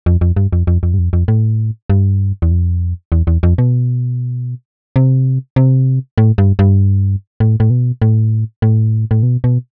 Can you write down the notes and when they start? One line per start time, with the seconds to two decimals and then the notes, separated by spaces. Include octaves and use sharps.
0.06 F2
0.21 F2
0.36 G2
0.53 F2
0.67 F2
0.83 F2
0.94 G2
0.99 F2
1.13 F2
1.28 A2
1.90 G2
2.42 E2
2.51 F2
3.12 E2
3.27 E2
3.43 F2
3.58 B2
4.96 C3
5.56 C3
6.18 A2
6.38 G2
6.59 G2
7.40 A2
7.60 A2
7.70 B2
8.02 A2
8.62 A2
9.11 A2
9.23 B2
9.44 B2